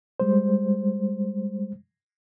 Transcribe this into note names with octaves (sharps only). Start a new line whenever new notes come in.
G3 G#3 C5